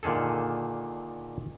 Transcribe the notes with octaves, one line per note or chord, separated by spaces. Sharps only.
A#2 D3 D#3 G#4 A4